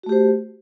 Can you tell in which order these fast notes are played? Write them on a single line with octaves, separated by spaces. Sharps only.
F#4 A3 G4 C5